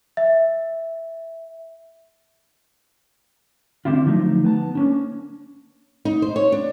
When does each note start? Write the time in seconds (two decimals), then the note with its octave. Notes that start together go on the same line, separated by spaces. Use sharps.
0.17 E5
3.85 D3 C4 D4 E4 F4
4.06 D3 F3 F#3 A3 D#4
4.44 B3 A5
4.75 A#3 C#4 D4
6.05 D#4
6.22 C5
6.36 C#5
6.52 D4